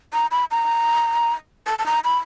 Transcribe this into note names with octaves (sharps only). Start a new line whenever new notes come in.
A#5
B5
A#5
A5
A5
A#5
B5